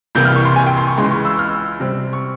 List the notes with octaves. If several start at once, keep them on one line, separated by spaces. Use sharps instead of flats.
C2 C3 E3 A#3 G6
F6
C#6
C6
G#5
G5
C6
C#6
C#2 C#3 E3 G#3 C6
C#6
E6
F6
C3 G3 C4
C#6